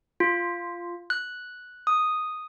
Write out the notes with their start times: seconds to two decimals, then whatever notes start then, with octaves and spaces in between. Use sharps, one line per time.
0.20 F4
1.10 F#6
1.87 D#6